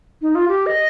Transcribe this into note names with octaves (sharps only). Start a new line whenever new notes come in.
D#4
F4
G4
D#5